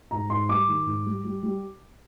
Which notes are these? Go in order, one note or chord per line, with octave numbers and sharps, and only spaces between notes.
G#2 A#5
G#2 C6
G3 D6
D#3
G#2
G3
G3
G3